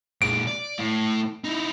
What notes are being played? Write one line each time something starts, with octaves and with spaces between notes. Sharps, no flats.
A#2 G#3 D7
D5
A2
D#4 E4